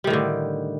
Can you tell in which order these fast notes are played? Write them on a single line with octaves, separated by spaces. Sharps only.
G3 D#3 A2 D3